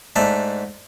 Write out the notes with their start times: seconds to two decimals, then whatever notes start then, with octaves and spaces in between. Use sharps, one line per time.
0.16 G#2 A3 D4